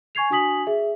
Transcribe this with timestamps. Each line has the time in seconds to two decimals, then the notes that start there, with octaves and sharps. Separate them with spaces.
0.15 G#5 C#6 G#6 C7 F7
0.30 D4 F#4 G#5 D#6 B6 F#7
0.67 G#4 E5